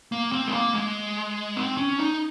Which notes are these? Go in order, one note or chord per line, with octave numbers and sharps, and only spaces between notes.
A#3
C4
G#3
A#3
G#3
C4
C#4
D#4